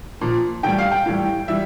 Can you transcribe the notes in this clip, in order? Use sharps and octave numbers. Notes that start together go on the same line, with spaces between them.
A#2 F3
A2 E3 G3 G5
F5
G5
A2 E3 G3
E3 G3 E5